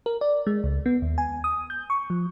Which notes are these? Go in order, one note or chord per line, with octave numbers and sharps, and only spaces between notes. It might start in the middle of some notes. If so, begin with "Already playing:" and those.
A#4
D5
G#3
C#2
B3
D#2
G#5
D#6
G6
C#6
F3